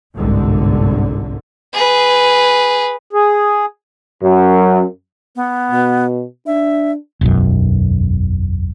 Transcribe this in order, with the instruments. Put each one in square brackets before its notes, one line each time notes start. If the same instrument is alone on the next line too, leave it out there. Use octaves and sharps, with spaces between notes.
[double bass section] G1 C2 G#2 D3
[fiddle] G#4 B4
[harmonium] G#4
[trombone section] F#2
[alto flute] B3
[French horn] B2
[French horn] D4 [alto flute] E5
[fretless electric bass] E1 B1 F#2